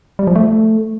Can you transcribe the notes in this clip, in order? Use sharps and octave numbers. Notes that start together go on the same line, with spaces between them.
G3
F3
A3